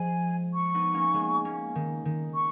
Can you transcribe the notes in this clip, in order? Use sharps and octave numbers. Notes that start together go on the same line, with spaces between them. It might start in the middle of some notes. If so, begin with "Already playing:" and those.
Already playing: F3 G#3 G#5
C#6
B3 D#4
A#3 C#4
G#3 B3
A#3 C#4
D#3
D#3
C#6